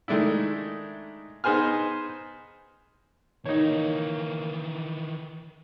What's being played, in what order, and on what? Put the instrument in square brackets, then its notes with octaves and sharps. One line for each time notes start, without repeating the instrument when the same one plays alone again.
[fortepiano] D#3 G#3 A3 D4 E4
B3 D#4 G#4 C5 G#5 F6
[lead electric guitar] D#3 E3 [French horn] A#3 [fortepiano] D#4 C#5